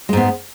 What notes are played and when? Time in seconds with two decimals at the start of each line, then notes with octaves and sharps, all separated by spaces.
0.09 G#3
0.13 G#2
0.17 B3